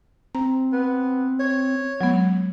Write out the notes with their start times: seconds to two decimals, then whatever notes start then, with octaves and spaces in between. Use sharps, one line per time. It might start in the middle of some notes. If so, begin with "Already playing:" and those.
0.35 C4 A#5
0.73 B3
1.40 C#5
2.01 F#3 G#3 B3